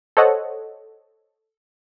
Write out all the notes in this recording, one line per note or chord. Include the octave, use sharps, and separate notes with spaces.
A4 C5 C#5 D#5 F#5